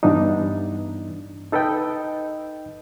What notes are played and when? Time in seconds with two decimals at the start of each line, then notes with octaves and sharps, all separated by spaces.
0.03 G2 E3 B3 D4 D#4
1.52 D#4 A4 B4 D#5 G5